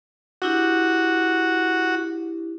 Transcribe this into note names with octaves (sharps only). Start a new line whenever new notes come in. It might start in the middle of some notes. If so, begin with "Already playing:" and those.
D4 E4 F#4 G4